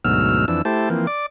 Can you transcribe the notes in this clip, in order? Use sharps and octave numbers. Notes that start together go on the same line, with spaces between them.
D2 G#2 B2 F#3 E6 F6
F2 E3 D4 E6
A3 E4 G4 C5 A5
E3 F3 A#3 C4
D5 D6